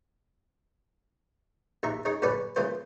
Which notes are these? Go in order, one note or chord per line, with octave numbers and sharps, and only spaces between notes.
A#1 D#2 E5 A#5
C#4 D#4 G#4
A#1 F#2 D3 C#4 B4 D5
C#3 E3 A#3 F4 C5